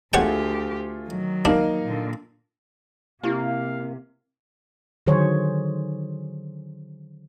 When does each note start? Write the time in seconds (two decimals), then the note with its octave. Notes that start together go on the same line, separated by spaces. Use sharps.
0.14 D2 A3 F4 G4 G#4 C#5 F#5 G5
1.09 D#3 F#3
1.45 A#3 D4 D#4 F5
1.85 A#2 D3
3.24 C3 A#3 E4 G4 F5 G#5
5.07 D3 D#3 F#3 G#4 C5 C#5